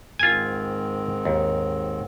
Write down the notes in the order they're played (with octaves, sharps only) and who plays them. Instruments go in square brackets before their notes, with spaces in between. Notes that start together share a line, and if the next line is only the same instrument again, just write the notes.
[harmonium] G#2 D#3 C4 [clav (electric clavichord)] F4 G#5
[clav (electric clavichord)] D#2